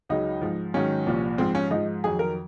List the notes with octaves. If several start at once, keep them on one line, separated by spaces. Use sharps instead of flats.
C#2 C#3 F#3 D#4
G#2 F3
G#2 D#3 F#3 C#4
C2 A#2 F3
G#2 F3 C4
C#4
G#2 F3 D#4
F2 D#3 F#3 G#4
A#4